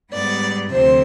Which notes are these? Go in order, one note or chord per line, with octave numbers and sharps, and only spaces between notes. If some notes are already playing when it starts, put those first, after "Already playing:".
G#2 G3 B3 D5
D2 C3 F3 C4 C5